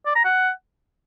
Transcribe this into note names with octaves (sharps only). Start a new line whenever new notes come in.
D5
A#5
F#5